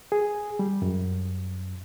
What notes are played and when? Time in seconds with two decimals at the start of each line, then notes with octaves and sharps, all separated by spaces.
0.12 G#4
0.59 G3
0.82 F#2